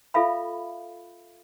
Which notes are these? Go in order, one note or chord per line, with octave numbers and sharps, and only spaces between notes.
F4 A4 E5 F5 B5